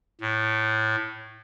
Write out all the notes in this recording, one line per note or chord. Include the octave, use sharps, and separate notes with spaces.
A2